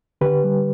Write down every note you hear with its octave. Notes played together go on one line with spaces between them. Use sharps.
D3 G4 B4
G3